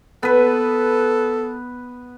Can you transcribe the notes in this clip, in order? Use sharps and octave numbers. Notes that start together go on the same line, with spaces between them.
B3 A4 B4